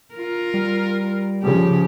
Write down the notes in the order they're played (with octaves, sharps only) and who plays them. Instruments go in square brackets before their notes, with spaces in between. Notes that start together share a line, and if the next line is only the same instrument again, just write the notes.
[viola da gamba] F4 A#4
[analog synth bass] G3
[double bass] C#3 F3 [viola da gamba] G4